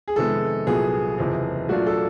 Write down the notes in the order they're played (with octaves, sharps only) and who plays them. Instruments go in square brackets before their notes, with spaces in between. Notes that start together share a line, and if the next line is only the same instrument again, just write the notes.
[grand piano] G#4
[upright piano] F2 C3 D#3 G#3 B3 [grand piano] A4
[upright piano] C2 A#2 F#3 B3 [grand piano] G#4
[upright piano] F#1 E2 C3 F3
[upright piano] A#2 F#3 A3 D4 F4 [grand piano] F#4
[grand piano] A4